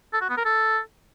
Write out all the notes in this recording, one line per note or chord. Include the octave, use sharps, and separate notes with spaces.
A4
F#4
B3
A#4
A4